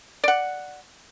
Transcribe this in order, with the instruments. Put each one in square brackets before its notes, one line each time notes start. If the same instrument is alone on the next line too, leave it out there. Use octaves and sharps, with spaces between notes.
[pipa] D5 F#5